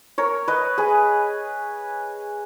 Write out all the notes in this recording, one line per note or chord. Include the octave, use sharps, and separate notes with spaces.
A#4 C#5
B4 D#5
G#4 B4